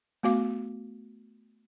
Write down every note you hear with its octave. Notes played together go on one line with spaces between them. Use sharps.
A3 B3 F#4 F5 D6